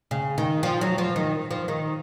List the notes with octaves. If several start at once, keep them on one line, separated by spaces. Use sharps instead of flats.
C#3
D#3
F3
F#3
F3
D#3
F3
D#3